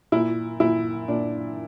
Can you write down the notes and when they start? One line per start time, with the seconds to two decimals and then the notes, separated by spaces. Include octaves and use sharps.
0.12 A#2 E4
0.60 A#2 E4
1.08 A#2 D4